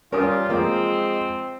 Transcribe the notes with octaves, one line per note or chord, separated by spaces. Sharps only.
G3 C#4 F4 A#4 D#6
F3 G#3 A#3 C4